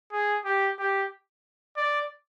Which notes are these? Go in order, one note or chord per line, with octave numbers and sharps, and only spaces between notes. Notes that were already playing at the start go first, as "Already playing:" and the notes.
G#4
G4
G4
D5